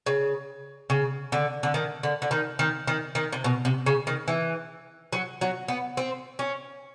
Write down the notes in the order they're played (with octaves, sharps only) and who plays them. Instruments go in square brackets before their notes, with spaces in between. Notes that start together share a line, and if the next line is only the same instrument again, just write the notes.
[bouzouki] C#3
C#3
D3
D3
D#3
D3
D3
D#3
D#3
D#3
D#3
C3
B2
C3
C#3
D#3
E3
F#3
F#3
B3
C4
C#4